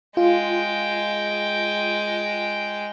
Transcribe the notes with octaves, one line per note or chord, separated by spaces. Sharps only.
G#3 F4 G5